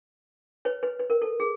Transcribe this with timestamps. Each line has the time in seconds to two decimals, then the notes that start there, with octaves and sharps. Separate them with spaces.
0.65 B4 C#5
0.83 B4
0.99 B4
1.10 A#4
1.22 A4
1.40 G#4